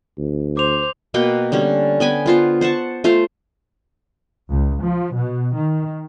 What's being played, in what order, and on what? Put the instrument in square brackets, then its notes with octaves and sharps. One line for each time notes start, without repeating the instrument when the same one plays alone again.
[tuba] D2
[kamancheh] C5 [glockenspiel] D6 F7
[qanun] B2 A#3 B4 G5
D3 G3 C#4 G4
B3 G5 G#5 B5
B3 F4 C5
C5 F#5 A5 C#6
A3 F4 C5 F5
[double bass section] C#2
F3
B2
D#3